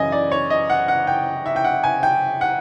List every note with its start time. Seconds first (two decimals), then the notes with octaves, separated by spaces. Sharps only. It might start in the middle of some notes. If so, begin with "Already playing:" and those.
Already playing: F#2 C#3 E3 D#5 G#5
0.12 D5
0.31 C#5
0.50 D#5
0.70 F#5
0.88 F#5
1.07 G5
1.46 E5
1.56 G5
1.64 F#5
1.84 G#5
2.03 G5
2.41 F#5